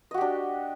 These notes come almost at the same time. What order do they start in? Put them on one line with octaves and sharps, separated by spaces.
D#5 F#4 G4 D4